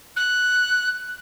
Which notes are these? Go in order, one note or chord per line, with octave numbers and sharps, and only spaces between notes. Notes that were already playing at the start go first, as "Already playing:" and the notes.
F#6